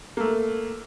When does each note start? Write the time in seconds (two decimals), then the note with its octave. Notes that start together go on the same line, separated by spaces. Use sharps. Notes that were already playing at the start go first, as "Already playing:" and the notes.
0.17 A3 A#3